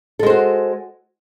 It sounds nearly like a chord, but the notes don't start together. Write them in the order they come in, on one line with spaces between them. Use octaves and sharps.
A4 G#3 C5 F#4